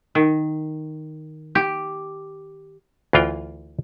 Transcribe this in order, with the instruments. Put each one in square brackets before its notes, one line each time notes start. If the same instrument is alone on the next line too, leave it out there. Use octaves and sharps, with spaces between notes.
[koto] D#3
G4
[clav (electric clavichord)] D2 E3 F4 G5